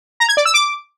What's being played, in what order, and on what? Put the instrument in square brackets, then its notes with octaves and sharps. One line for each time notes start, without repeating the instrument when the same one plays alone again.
[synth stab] A#5
G#6
D5
E6
D6